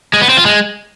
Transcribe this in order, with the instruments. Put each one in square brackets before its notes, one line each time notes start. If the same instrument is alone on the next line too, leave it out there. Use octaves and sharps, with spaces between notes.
[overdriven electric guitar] G#3
B3
C4
F4
G#3